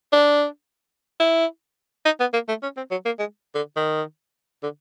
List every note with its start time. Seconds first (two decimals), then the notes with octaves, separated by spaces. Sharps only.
0.13 D4
1.20 E4
2.05 D#4
2.20 B3
2.33 A#3
2.48 A3
2.63 C#4
2.77 C4
2.91 F#3
3.06 A#3
3.19 G#3
3.55 D3
3.76 D#3
4.63 D3